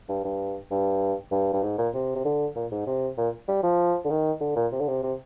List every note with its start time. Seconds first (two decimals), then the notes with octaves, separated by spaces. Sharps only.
0.09 G2
0.24 G2
0.71 G2
1.31 G2
1.53 G2
1.63 G#2
1.78 A#2
1.94 C3
2.16 C3
2.25 D3
2.55 A#2
2.71 G#2
2.86 C3
3.17 A#2
3.48 G3
3.63 F3
4.04 D3
4.10 D#3
4.40 D3
4.56 A#2
4.72 C3
4.80 D3
4.88 C3
5.03 C3